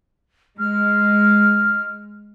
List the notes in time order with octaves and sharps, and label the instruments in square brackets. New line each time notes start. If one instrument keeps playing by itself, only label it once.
[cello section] G#3 [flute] F6